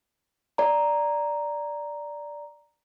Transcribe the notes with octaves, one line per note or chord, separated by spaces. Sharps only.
D5 A#5